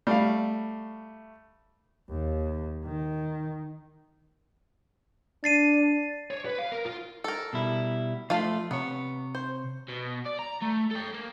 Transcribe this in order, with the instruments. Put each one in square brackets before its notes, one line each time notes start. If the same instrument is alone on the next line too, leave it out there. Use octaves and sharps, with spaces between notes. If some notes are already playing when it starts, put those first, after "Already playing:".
[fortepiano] G3 F5 [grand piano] A3
[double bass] D#2
D#3
[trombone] D4 [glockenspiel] A6 C7 D#7
[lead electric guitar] C#5
B4
F5
A#4
F4
[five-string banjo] A4 A#4
[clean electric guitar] B2 G3 E4
[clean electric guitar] F3 A3 [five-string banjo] F4 A4 F5
[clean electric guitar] C3 C#5 [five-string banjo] B3
[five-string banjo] C5
[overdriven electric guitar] B2
D5
A#5
A3
A4 G5
A#3